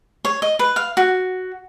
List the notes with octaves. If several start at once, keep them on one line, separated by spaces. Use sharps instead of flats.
C#5
D#5
B4
F5
F#4